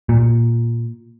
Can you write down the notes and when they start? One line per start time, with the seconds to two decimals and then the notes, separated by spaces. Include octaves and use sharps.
0.09 A#2